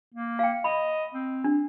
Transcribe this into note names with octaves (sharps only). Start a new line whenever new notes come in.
A#3
F5 G5
D#5 B5
C4
D4